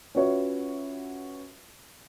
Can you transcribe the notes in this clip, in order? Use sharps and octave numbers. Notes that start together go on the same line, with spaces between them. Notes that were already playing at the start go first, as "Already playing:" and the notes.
C#4 F4 F#4 B4 C#5 E5